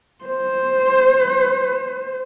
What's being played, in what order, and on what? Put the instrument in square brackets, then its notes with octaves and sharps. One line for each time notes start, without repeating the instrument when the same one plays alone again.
[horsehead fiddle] C5